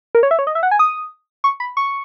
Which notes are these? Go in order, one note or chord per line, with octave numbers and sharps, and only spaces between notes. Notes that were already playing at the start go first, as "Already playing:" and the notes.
A#4
C#5
E5
C#5
D#5
E5
F#5
G#5
D#6
C#6
B5
C#6